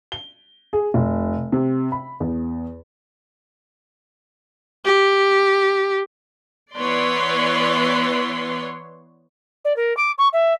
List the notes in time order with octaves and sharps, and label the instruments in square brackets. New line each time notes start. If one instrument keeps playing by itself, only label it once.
[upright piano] G7
G#4
F1
C3
B5
E2
[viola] G4
[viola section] E3 B3 B4 C#5 D5 C6
[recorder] D5
A#4
D6
C#6
E5